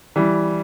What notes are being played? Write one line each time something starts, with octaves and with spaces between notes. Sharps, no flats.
E3 G3